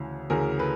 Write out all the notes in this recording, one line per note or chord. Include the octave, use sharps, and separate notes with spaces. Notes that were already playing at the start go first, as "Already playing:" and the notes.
Already playing: D2 C#3 E3
D2 C#3 E3 G#4 A#4
A4 B4